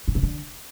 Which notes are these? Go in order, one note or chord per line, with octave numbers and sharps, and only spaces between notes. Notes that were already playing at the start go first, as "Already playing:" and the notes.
A2
C3
D3